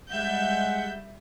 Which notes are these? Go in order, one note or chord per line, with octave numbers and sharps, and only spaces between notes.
G3 G#3 E5 F#5 G6